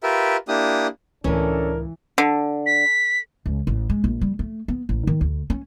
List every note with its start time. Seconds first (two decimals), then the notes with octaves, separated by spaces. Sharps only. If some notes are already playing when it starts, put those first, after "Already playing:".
0.03 F4 G4 A#4 B4 E5
0.48 A#3 D4 E4 G4 D#6
1.24 C#2 A2 E3 C#4 D4 A4 A#4
2.18 D3
2.66 B6
3.46 C#2
3.67 A1
3.90 G#3
4.04 A#1
4.21 G3
4.39 A3
4.68 B3
4.89 A1
5.07 D#3
5.21 D2
5.50 C#4